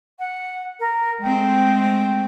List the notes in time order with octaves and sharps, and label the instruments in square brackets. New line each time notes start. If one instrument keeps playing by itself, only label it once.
[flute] F#5
A#4
[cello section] G#3 A3 C4 [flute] G5